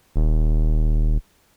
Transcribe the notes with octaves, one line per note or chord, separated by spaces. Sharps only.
D#1